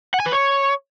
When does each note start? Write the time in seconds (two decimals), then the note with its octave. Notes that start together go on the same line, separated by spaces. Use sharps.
0.14 F#5
0.20 G#5
0.26 B4
0.32 C#5